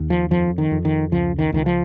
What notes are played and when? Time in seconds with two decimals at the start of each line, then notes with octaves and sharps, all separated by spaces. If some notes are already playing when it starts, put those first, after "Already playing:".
Already playing: D#2
0.10 F3
0.31 F2 F3
0.58 D#3
0.71 F2
0.85 D#3
1.12 C#2 F3
1.39 D#3
1.52 C#2 D#3
1.66 F3